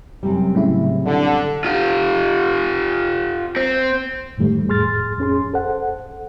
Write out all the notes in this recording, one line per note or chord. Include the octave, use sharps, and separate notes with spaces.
F#2 C3 G3
A2 C#3 E4
D3
F4 G4
C4
F#2 A2 D#3 G3 A3
F2 A2 G#4 C6 F6 A6
F2 C#4 G#4 C6
A4 C5 F#5